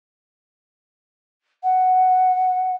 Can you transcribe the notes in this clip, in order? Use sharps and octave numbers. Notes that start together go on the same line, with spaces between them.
F#5